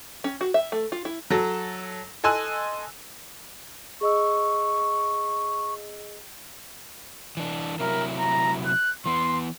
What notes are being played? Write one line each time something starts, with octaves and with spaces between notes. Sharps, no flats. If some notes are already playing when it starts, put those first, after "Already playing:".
C#4
F#4
E5
A3
F4
E4
F#3 A4 A#6
A4 D#5 G#5 C6 E6 F#6
G#4 D#5 C#6 E6
E3 D4
C3 F#3 E4 A#4
A#5
F#6
E3 B3 C6